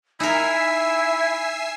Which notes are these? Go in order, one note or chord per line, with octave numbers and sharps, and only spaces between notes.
D#4 E4 A#4 E5 G#5 E6 C7